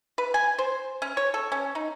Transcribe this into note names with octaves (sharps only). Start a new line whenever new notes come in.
B4
G#5
C5
C#4
C#5
A4
C#4
D#4